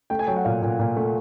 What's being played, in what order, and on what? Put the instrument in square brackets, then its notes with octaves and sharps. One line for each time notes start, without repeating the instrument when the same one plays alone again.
[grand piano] A3 G5
G#5
F#3 G5
F#5
A#2 F5
A#2
A#2
A3